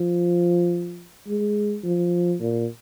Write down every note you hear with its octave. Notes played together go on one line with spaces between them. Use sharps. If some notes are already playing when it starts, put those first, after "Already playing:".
Already playing: F3
G#3
F3
A#2